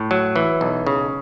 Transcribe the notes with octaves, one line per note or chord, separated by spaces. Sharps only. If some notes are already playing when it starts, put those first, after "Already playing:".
Already playing: A2
F#3
E3
B1
C#3